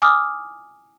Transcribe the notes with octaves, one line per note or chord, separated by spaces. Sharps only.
G#5 D6 D#6 F6